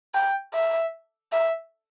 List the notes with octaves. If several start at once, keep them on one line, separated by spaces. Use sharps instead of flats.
G5
E5
E5